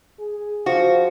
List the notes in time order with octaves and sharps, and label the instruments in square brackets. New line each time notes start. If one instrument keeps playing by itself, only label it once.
[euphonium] G#4
[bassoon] F3 [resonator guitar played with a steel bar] F#4